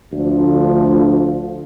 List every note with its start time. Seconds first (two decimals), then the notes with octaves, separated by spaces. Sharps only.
0.12 D2 F3